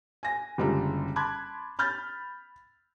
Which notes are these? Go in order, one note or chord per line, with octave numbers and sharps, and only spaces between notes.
G#5 A#6
F#1 D3 G3 G#3 F4 A#5
A5 B5 C6 D6 F#6 G#6
B5 F6 G6 A6